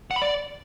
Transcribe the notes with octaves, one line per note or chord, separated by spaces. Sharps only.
F#5
B5
D5